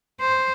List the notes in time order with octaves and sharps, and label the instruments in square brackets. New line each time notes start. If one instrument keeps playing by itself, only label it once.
[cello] C5